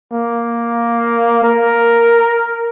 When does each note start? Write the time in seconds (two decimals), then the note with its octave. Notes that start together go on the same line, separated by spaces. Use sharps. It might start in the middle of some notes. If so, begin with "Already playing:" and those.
0.12 A#3
1.43 A#4